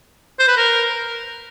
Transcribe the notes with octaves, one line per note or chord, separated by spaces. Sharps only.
C5
B4
A#4